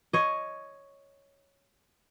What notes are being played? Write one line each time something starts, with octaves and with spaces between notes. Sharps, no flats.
C#5 D#5